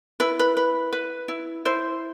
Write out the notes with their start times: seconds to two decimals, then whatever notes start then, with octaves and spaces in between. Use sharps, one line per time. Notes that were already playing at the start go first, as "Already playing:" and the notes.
0.20 E4 B4
0.39 B4
0.57 B4
0.93 B4
1.28 E4
1.65 E4 C5